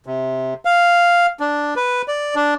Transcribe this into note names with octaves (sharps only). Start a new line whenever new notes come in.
C3
F5
D4
B4
D5
D4